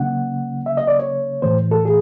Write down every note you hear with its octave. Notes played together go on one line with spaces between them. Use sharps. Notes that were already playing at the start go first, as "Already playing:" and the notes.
Already playing: C#3 F#3 A#3 C#4 F#5
E5
D#5
D5
C#5
A2 E3 A3 C5
A4
G#4